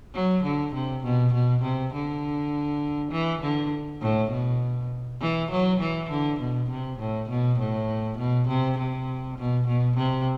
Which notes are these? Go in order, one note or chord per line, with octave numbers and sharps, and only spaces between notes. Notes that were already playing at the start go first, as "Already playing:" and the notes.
F#3
D3
C3
B2
B2
C3
D3
E3
D3
A2
B2
E3
F#3
E3
D3
B2
C3
A2
B2
A2
B2
C3
C3
B2
B2
C3